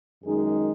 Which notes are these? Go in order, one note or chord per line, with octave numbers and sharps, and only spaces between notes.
F#2 D#3 G#3 D#4 G#4